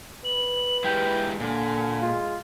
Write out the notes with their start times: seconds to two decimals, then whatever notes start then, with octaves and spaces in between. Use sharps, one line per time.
0.24 B4 F#7
0.84 G#3 E4 G4 G5
1.40 A#2 D3 G#5
2.03 G#3 F4